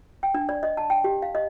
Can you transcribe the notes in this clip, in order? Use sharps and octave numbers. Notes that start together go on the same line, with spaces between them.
G5
D4
D5
D#5
A5
G5
G4
F5
D#5